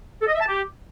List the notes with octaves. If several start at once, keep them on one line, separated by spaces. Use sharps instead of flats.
A4
D#5
E5
A5
G4